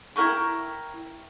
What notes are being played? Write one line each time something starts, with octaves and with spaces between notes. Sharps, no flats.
E4 A#4 G5 C#6